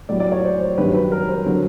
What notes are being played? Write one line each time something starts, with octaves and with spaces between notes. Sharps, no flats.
A2 F#3 D5
D5
C#5
C5
C5
G2 D#3 F#3 B4
B4
A#4
C5
D3 F#3